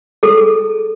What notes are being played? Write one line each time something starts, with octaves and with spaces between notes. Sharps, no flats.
G#4 A4